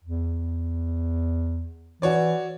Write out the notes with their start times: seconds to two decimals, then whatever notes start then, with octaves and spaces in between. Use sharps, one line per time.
0.04 E2
2.02 E3 F#4 C#5 D5